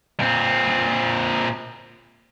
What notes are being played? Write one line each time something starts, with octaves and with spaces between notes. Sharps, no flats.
A#2 C4